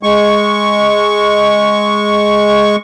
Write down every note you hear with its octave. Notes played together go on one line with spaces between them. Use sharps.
G#3 C#6